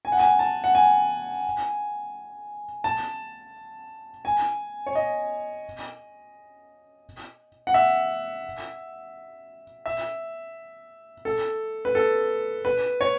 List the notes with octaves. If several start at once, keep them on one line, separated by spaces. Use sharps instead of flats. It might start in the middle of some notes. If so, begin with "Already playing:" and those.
G#5
F#5
G#5
A5
F#5
G#5
A5
G#5
C#5
D#5
F#5
E5
E5
A4
B4
A4
B4
C#5